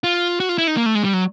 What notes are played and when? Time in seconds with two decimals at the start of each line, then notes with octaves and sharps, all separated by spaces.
0.04 F4
0.40 F#4
0.49 F4
0.58 E4
0.67 D#4
0.77 A#3
0.86 A3
0.95 G#3
1.04 G3
1.13 F#3